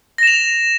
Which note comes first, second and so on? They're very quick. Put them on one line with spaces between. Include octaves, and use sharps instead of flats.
A#6 E7 F7